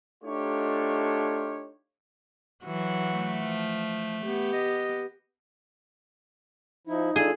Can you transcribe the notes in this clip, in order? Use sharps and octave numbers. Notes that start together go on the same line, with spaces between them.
A3 D4 D#4 F4 G4 C#5
E3 F#3 F#4
A3
F3
B3 G4
D#5
F3 D#4 E4
D4 F4 G#4 A4